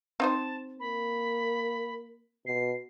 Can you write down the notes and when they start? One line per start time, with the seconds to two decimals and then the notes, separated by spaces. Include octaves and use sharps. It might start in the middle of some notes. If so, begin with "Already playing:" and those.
0.20 C4 D#4 C5 A5
0.80 A#3 B5
2.47 B2 C7